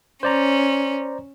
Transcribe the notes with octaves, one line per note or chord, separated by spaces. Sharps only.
C#4 C5 D5 A#5